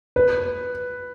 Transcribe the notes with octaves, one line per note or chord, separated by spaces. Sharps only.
B4